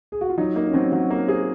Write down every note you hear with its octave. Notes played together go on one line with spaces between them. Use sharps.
G#4
F#4
F4
F#3 D#4
A#3 D#4
C#4
F#3 C4
F#3 F#4
A#3 A#4
G#4 C5